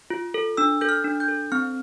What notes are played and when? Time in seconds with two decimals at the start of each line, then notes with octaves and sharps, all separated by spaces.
0.10 F4
0.34 A4
0.57 D4 E6
0.81 A4 G6
0.89 F6
1.04 D4
1.20 G6
1.28 A4
1.52 C4 F6